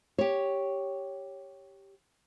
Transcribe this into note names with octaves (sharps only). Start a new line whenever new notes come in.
G4 C#5